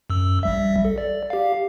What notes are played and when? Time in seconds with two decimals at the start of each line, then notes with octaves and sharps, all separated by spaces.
0.10 F#2 E6
0.43 A#1 G3 E5
0.85 A4
0.98 D5
1.30 G4 F5